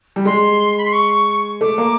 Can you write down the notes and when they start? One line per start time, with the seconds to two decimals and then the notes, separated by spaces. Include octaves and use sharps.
0.16 G3
0.25 G#3 C6
0.78 B5
0.85 C6
0.93 C#6
1.61 A3 D6
1.78 A#3